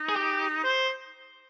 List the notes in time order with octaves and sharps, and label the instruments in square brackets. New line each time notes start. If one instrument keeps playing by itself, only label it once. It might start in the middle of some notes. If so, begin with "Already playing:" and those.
Already playing: [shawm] D#4
[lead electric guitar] G#4
G4
[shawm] C5